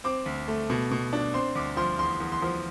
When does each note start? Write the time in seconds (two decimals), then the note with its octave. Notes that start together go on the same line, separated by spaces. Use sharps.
0.04 C4 D6
0.26 D2
0.48 A3
0.70 B2
0.91 B2
1.13 D4
1.34 C4 C6
1.55 D2 D6
1.77 F3 C6
1.99 E2 C6
2.20 E2
2.32 C6
2.42 F3